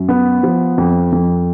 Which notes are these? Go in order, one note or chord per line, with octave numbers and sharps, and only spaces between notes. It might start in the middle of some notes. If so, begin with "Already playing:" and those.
Already playing: F#2
B3
F3
F2
F2